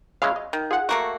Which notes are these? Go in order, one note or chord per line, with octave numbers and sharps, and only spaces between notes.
C#3 G#3 E4 F5
D#5
D#3
F4 G#4 F#5
A3 A#3 F#4